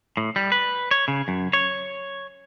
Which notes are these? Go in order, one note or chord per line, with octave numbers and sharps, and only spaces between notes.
A2
G3
B4
C#5
C#3
F#2
C#5